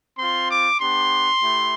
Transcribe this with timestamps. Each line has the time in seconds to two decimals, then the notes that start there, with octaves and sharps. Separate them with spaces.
0.18 C4 F4 C6
0.50 D6
0.80 B3 D4 G4 C6
1.42 A3 E4 G4